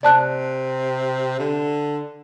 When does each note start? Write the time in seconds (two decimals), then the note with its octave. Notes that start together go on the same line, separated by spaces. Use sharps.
0.03 C3 D5 A5 F#6
1.39 D3